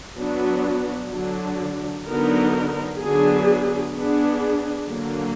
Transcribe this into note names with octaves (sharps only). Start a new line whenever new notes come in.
F#3 B3 D4 F#4
D3 F#3 D4
D3 F#3 B3 D#4 A#4
D3 F#3 B3 D4 G#4
B3 D4 G#4
D3 F#3 A#3